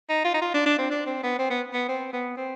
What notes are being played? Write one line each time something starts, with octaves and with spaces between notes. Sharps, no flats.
D#4
F4
D#4
F4
D4
D4
C4
D4
C4
B3
C4
B3
B3
C4
B3
C4